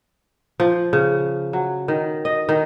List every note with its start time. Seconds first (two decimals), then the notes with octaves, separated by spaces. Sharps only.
0.60 F3
0.93 C#3
1.53 F#3
1.88 D#3
2.25 D#5
2.49 D#3